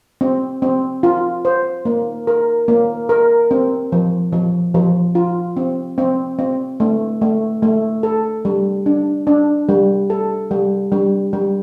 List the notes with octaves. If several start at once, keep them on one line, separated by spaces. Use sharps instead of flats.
C4
C4
F4
C5
A#3
A#4
A#3
A#4
C4
F3
F3
F3
F4
C4
C4
C4
A3
A3
A3
A4
G3
D4
D4
G3
A4
G3
G3
G3